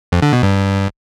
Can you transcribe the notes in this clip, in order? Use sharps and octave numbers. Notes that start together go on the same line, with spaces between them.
F2
D3
B2
G2